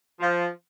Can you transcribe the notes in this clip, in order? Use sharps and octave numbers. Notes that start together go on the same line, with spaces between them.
F3